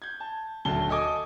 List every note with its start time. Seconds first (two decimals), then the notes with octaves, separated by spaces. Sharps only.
0.02 G6 G#6
0.20 A5
0.65 D#1 D2 F#3 A5 G7
0.89 A4 D#5 G#5 D6 D#6